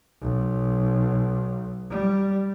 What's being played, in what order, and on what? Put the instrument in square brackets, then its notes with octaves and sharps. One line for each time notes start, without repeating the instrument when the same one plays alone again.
[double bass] B1
G3